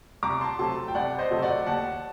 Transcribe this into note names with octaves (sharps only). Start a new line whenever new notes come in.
C2 A#5 D6
A5 C6
C3 F#3 A3 A5 C6
G5
C2 D5 F#5
C5 D#5
C3 F#3 A3
D5 F#5
D#2 F#5 A5